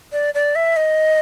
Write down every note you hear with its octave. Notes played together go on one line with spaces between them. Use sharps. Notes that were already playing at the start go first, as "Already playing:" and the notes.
D5
D5
E5
D#5